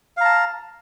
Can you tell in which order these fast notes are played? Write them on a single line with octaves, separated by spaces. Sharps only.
F5 A#5 A5